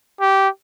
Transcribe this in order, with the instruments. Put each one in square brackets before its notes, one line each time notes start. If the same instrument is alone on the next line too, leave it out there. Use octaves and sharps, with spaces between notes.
[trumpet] G4